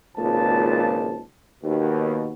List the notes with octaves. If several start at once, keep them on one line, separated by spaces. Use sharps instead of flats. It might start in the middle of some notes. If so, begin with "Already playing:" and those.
G#1 C#2 A#2 F3 A5
D#2 B2